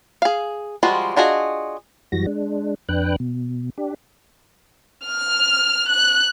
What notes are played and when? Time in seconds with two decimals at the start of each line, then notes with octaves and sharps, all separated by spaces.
0.22 G#4 F5
0.83 F3 G3 G#3 F4 F#4
1.16 D4 F4 F#4 G#4 D#5
2.12 F#2 E3 G3 F#4 A#6
2.26 G#3 D4
2.89 F2 D4 B4 G5 F#6
3.20 B2
3.78 D4 G4
5.06 F6
5.89 F#6